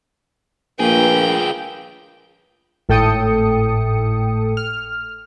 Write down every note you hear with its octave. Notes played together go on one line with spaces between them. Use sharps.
A#1 A#3 F4 G#4 B4 G5
G#1 A2 A4 G5 D#6 C#7
F6